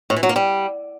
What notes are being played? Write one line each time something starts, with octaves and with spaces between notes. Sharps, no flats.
A2
E3
F#3
A#3
G3